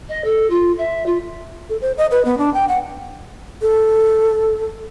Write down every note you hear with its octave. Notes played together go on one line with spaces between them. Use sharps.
D#5
A4
F4
E5
F4
A4
C5
D#5
B4
B3
D4
G5
F#5
A4